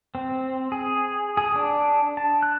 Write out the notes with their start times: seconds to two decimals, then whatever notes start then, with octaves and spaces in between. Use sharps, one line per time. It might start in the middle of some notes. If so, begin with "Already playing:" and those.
0.15 C4
0.72 G#4
1.37 G#4
1.56 D4
2.17 A5
2.43 F#6